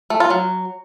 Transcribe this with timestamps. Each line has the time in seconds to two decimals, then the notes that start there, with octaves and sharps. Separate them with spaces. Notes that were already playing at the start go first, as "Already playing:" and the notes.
0.10 A3
0.20 F4
0.30 F#3